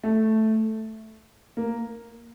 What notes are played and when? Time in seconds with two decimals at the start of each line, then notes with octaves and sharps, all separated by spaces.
0.04 A3
1.57 A#3